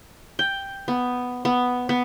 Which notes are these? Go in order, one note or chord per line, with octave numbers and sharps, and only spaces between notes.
G5
B3
B3
B3